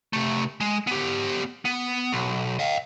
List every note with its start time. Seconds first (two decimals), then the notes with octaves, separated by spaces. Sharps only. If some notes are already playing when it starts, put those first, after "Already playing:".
0.13 C3 A3
0.61 G#3
0.87 B3 G4
1.65 B3
2.13 B1
2.59 D#5 F5